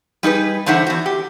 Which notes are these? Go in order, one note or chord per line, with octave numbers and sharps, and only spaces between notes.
G3 D#4 G#4 B4
E2 D3 D#4 C5 E5 F#5
E2 F#4
G4